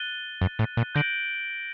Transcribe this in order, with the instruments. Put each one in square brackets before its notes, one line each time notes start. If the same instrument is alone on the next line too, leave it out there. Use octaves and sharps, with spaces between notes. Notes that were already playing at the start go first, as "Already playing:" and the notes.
Already playing: [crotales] F#6 A6 D#7 G7
[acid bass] F#2
A2
A#2
[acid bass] D3 [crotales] G6 A#6 D7 F#7